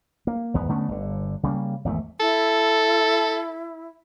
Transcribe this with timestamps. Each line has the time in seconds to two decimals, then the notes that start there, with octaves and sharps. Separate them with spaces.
0.27 A#3
0.54 G#1 E2 B3
0.69 D3 A3 B3 C#4
0.88 G1 D3
1.43 C#3 G3 G#3 A#3
1.85 G#1 E2 D3 A3
2.20 E4 A4